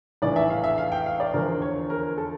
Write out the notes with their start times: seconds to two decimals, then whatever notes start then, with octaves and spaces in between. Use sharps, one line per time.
0.22 A#1 A2 E3 D5
0.36 E5
0.50 F5
0.64 E5
0.78 F5
0.92 G5
1.06 F5
1.20 D5
1.34 E2 D3 F3 A#4
1.62 C#5
1.90 A#4
2.18 A4